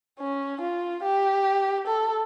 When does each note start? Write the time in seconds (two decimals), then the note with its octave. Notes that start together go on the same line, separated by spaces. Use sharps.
0.19 C#4
0.61 F4
1.03 G4
1.87 A4